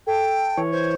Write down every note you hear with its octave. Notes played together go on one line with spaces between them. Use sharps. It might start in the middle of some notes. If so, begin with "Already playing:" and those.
A4 G5
E3 C#5
C5 G#6